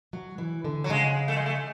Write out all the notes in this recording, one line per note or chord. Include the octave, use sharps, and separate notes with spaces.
F#3
E3
D3
F#3
C#3 G#3
A3
G#3
A3